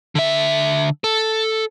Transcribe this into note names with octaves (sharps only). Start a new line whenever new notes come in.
D3 E5
A4